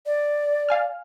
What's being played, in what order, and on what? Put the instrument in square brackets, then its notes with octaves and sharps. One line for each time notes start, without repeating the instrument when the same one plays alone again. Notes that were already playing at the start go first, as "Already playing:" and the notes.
[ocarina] D5
[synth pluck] F5 G#5 F6